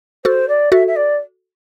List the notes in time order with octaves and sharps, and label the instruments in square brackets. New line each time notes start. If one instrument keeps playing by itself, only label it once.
[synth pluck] F#4 A4 [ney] C5
[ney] D5
[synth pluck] F#4 A4 [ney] E5
[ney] E5
D5